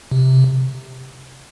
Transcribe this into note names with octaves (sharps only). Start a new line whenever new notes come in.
C3